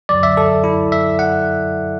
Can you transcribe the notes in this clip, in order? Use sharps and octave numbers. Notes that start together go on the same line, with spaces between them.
F#2 D3 F#3 D5
E5
A4
E4
E5
F#5